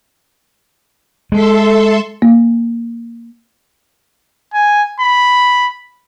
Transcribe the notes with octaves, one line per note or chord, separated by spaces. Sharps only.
G#3 A4 E5 C6
A#3
G#5
B5